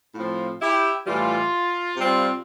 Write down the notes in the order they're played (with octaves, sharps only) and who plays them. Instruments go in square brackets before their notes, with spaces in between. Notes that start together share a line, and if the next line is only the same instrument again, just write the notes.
[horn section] A2 F3 C4 F4
E4 G4
A2 E3 G3 F4
C3 G3 C4